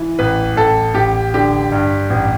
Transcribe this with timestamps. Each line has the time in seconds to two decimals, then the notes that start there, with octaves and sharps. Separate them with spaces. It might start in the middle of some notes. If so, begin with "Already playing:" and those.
Already playing: E3
0.19 A1 B4
0.56 A1 A4
0.95 A1 G4
1.34 D3 G4
1.72 G2
2.10 A1